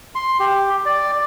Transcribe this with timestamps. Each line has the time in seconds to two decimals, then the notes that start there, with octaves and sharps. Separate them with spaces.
0.15 C6
0.40 G4
0.86 D5